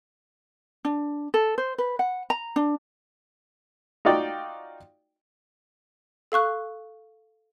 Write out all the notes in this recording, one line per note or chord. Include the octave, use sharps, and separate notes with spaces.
D4
A4
C5
B4
F#5
A#5
D4
D#4 F4 F#4 D5 G5
A4 F5 C#6 F#6